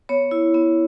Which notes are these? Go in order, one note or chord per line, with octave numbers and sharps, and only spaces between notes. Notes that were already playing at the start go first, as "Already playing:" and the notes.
B3 C#5
E4
B3